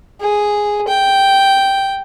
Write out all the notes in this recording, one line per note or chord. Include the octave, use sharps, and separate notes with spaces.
G#4
G5